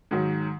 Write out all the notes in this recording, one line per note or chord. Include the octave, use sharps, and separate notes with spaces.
G#2 D#3 F#3